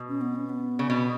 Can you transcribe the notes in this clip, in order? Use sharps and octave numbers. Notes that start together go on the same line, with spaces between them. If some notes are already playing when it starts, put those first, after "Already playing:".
Already playing: B2
C#4
B3
C#4
B3
C#3
B2